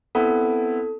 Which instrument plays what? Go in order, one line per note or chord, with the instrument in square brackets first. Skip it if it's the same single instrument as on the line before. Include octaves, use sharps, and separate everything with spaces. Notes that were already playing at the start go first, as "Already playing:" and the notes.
[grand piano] B3 C4 E4 [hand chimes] A4